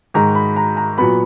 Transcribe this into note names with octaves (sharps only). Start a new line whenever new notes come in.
G#2 D#3 G#3 A#5
B5
A#5
A#5
A#2 F#3 B3 B5